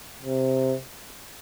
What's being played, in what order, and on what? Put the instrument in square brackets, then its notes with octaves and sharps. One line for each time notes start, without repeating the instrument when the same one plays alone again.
[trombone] C3